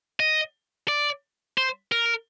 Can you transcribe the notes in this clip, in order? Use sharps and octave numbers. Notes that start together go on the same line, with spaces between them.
D#5
D5
C5
A#4